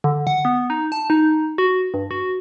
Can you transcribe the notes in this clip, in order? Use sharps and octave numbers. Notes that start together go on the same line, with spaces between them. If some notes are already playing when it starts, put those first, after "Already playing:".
D3
F#5
B3
D#4
A5
D#4
F#4
G2
F#4